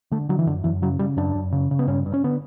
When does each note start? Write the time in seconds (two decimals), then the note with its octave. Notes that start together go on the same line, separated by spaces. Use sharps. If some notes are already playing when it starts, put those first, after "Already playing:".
0.11 D3 A3
0.29 D3 F#3
0.39 E3
0.46 F#2 D3
0.64 F#2 E3
0.82 C#3 F#3
0.99 C#3 G3
1.17 F#2 D4
1.35 F#2
1.52 C#3
1.71 C#3
1.79 B3
1.87 G2 C#4
2.06 G2
2.14 C#4
2.24 D3 B3